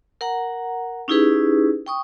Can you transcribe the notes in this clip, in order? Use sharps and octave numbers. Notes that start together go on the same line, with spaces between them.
A#4 F#5 A#5
C#4 D#4 E4 G4 G#4 B4
G5 C#6 D#6